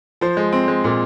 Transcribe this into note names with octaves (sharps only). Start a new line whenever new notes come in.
F3 C5
G#3
C4
G#3
A#2